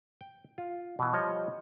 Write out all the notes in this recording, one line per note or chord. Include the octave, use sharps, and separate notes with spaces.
G5
F4
B2 E3
F3 G3 C#5 D#5